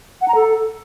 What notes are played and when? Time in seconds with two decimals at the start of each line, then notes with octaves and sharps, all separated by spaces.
0.21 F#5
0.28 A#5
0.35 A4